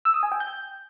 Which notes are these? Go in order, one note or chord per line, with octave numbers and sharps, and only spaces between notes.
E6
D#6
G#5
G5
G6